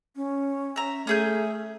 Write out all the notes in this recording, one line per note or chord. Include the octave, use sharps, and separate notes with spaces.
C#4
E5 A#5
A3 C#4 G#4 E5 G6